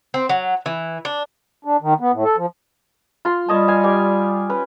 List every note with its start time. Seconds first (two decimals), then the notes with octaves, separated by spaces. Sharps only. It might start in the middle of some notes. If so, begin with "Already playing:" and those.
0.14 C4
0.29 F#3
0.66 E3
1.05 D4
1.65 D4
1.81 D#3
2.00 B3
2.12 A2
2.24 A4
2.37 F3
3.25 F4 C6
3.49 G3 C#5 D#5 A5
3.68 F5 G#5
3.84 G4 D5 G#5
4.50 C#4 B4